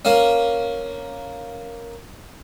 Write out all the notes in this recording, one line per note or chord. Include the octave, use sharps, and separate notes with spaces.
A#3 C#4